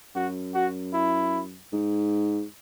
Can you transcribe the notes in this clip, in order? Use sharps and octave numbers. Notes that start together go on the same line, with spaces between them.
F#2 F#4
F#4
E4
G#2